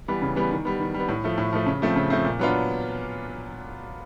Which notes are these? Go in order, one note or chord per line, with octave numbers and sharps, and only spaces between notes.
E3 G3 B3
C#3
E3 G3 B3
D#3
G3 B3
D#3
G3
B3
A2
F3 A3
A2
F3 A3
C#3
F3 A3 C4
C#3
F3 A3 C4
A#2
F#3 B3 D4 F4